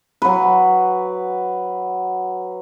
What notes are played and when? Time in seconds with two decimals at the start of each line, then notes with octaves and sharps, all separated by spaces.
0.22 F#3 B4